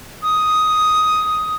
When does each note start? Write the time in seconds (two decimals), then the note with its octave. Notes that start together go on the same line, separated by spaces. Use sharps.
0.23 D#6